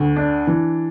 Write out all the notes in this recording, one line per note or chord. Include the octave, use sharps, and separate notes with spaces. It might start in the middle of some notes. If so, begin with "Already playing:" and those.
Already playing: D2
D4
E3